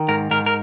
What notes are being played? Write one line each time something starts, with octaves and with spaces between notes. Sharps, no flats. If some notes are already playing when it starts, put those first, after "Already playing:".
Already playing: D#3
G#2 A#4
G#2 A#4
A#4